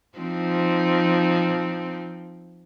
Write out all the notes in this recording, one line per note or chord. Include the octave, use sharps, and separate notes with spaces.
F3 C4 D#4